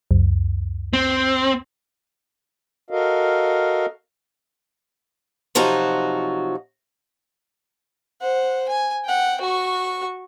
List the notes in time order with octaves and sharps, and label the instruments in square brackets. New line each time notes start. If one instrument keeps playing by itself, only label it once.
[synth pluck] C#2 F#2
[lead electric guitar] C4
[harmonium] F#4 A4 A#4 D#5 F5
[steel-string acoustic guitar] C3 F3 F#3 D#4 F#4
[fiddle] C5 F#5
G#5
F#5 G5
F#4 C#6